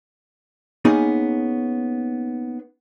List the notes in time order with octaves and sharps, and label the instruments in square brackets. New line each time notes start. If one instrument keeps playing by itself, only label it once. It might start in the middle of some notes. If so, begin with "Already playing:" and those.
[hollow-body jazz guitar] A#3 B3 C#4 D#4 G#4